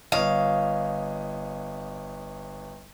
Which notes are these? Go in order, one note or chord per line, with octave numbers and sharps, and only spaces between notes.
G1 C#5 D#5 F5